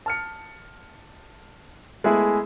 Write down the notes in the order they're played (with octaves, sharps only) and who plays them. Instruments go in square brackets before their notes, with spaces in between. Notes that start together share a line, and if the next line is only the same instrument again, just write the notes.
[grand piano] A5 F6 C#7
G#3 A3 B3 E4 G#4